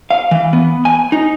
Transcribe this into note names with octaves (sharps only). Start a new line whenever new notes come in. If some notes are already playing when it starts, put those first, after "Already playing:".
F5
E3
B3
G#5
D#4